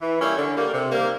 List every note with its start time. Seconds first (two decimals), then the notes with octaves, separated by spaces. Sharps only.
0.01 E3
0.19 G3 A#3 C#4 E4
0.37 D3
0.55 G3 A#3
0.73 C3
0.91 D#3 G3 A#3